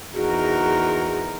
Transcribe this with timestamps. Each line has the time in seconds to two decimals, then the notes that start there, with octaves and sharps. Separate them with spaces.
0.14 E2 D#4 F#4 G#4 A#4